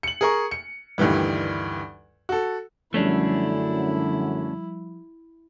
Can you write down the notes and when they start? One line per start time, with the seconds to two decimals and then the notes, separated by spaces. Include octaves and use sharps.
0.03 C#7 F#7
0.21 G#4 A#4 C#6
0.51 C#7
0.98 D2 G2 D#3 E3 G3
2.29 F#4 A4
2.94 F#2 D3 F3 G3 A3 C#4 D4 E4